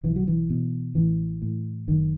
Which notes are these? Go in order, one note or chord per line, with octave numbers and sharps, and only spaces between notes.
B1 E3
F#3
E3
B2
A1 E3
A2
F#1 D#3